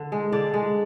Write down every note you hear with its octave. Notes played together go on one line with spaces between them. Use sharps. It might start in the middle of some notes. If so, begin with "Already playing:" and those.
Already playing: D3
G#3
D3 D5
G#3